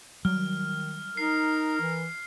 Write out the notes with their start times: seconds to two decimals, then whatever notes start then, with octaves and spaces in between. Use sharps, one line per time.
0.25 D#3 F#3 G3 F6
1.17 D#4 A#4 C7
1.81 E3